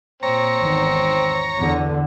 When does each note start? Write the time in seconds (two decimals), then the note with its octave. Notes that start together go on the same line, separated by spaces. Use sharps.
0.23 A#2 C4 C#5 A#5
0.60 G#1 E2 D#3
1.58 E2 D3